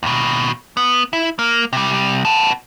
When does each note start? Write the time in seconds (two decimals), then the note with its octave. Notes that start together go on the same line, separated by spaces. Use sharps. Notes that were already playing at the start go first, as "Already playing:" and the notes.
0.03 D#2 B2
0.77 B3
1.13 E4
1.39 A#3
1.73 C3 G3
2.25 B3 A5